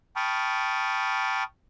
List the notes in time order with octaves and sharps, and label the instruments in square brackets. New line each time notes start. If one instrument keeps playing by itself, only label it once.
[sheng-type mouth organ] G5 A5 B5 C#6 D#6 F6